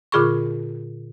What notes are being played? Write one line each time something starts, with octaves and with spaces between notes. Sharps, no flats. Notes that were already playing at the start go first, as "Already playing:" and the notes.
A#2 D3 F4 G#4 B5 C#6